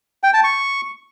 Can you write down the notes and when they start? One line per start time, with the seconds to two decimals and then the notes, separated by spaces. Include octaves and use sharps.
0.23 G5
0.34 A5
0.44 C#6